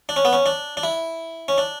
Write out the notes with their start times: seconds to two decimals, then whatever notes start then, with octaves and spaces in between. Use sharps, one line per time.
0.09 D4
0.16 C#4
0.25 B3
0.33 C#4
0.46 D4
0.77 D4
0.83 E4
1.48 C#4
1.58 D4